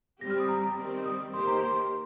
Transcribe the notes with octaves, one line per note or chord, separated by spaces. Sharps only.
G3 C4 G4 A#6
F6
D#6
A#5
A#5
D#3 G3 C4
D#6
D#3 A#3 G4 C5 C6
A#5
C6